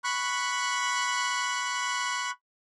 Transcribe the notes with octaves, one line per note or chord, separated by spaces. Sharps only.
B5 C#6 F#6